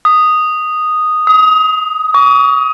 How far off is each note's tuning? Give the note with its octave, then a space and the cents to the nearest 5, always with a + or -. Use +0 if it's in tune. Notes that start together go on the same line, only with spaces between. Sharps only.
D#6 -5
D#6 +25
C#6 +40